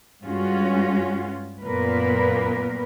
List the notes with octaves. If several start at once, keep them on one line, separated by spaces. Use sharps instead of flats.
G2 G#3 C#4 F4 F#4
F#2 A#2 A#3 B3 A#4 B4